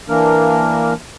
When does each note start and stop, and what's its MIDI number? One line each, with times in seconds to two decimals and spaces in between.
0.09 0.93 52
0.09 0.93 58
0.09 0.93 62
0.09 0.93 70